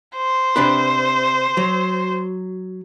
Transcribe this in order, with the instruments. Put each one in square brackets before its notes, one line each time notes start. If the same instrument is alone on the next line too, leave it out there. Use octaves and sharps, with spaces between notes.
[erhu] C5
[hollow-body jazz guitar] C3 D4 B4
F#3